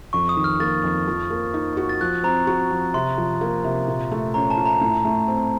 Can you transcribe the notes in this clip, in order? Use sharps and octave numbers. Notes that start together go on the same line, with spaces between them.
F2 C#6
D#6
D#3
F6
A#3 A6
F2
F3
A#3
D#4
F#4
A6
F3 F#6
C4 A#5
F#4
F3
C3 C6
F3
A#3
C3
A#2
A3
C#4 A#5
A5
F4
A#5
A2
A3
C4